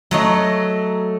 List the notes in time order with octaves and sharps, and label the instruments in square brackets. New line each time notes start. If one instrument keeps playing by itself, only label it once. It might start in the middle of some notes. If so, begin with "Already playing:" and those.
[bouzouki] F#3 A3 D#5